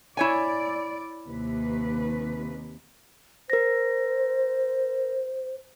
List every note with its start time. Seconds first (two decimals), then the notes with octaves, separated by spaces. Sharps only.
0.17 E4 C#5 D5 G#5
1.27 D#2 C3 B4
3.50 A#4 C5 A#6